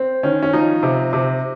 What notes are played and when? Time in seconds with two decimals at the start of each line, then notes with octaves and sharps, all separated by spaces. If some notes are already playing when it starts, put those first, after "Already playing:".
Already playing: C4
0.23 D#3 C#4
0.43 C#4
0.53 F3 D#4
0.83 C3
1.13 C3